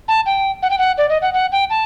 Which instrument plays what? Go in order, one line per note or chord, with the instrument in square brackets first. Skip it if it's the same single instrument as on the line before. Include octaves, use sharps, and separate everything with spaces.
[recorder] A5
G5
F#5
G5
F#5
D5
D#5
F#5
F#5
G5
A5